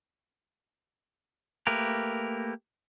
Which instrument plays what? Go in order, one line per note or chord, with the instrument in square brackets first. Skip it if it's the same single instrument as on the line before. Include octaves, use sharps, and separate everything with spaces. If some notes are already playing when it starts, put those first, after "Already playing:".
[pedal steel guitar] A3 A#3 G4 A#4 B4